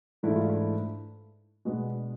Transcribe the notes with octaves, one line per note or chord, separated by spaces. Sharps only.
G#2 E3 A3 D4 E4
F4
E4
B2 G#3 B3 D4 F#4